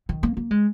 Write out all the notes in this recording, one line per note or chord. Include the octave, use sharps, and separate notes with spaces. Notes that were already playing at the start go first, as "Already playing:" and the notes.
D#3
A#3
A#3
G#3